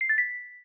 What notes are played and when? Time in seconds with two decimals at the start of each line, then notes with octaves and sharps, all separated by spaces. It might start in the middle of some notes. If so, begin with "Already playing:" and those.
0.01 C7
0.09 A6
0.18 B6